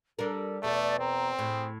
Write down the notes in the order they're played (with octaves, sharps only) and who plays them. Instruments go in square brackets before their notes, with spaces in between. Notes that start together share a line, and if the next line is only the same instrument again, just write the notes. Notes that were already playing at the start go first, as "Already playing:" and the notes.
[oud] G3 D4 A#4 [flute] A4
[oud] E2 B2 A4 [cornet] A3 [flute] D5
[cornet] C4 [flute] A#5
[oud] A2 [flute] G#4